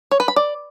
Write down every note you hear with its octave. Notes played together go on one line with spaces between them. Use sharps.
C#5
B4
B5
D5